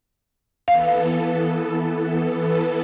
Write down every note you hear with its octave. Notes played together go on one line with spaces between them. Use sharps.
E3 B3 A4 F5